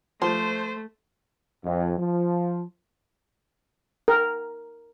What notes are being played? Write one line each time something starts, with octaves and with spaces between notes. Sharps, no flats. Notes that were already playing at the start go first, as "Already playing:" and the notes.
F3 A3 C5 C6
F2
F3
A#4